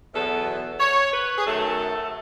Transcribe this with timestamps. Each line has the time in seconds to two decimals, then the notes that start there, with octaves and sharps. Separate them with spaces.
0.12 E2 B2 F#3 B3 A4
0.79 C#5
1.12 B4
1.36 G#4
1.45 F#2 D#3 A3 A4